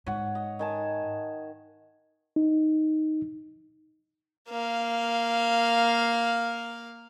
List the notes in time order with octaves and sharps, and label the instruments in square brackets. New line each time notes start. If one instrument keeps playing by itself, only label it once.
[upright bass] G#2 [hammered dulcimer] C#5 F#5
[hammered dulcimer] D#5
D#3 G#5 A5
[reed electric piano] D#4
[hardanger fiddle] A#3 F5